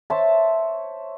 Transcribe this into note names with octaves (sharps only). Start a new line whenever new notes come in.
C5 C#5 E5 A5